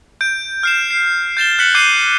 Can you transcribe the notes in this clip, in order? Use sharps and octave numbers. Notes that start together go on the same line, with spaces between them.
G6 D7
F6 C7 E7
C7
G6 A6 E7 G7
F#6 B6 C#7 F#7
D6 G6 C7 D#7 G7